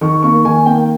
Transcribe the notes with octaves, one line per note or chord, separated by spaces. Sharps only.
D#3 C#6
A#3 C#6
D#3 G#5
A#3 G5